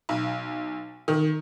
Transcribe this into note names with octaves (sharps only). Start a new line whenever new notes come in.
B1
D#3